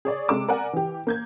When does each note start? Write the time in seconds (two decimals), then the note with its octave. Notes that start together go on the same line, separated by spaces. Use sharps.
0.05 G#4 C#5 D5
0.28 C3 G#3 A4 D6 E7
0.48 A#4 D5 F#5 G#5
0.73 E3 G4
1.07 A#3 G6 G#6